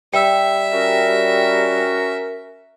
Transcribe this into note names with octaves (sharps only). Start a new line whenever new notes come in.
G3 E5 G5 E6
C#4 F#4 A#4